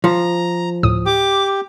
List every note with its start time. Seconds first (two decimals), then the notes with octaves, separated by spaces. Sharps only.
0.04 F3 A#5
0.83 D2 A2 D#6
1.06 G4 D6